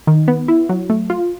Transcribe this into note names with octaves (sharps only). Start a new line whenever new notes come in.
D#3
B3
E4
F#3
A3
F4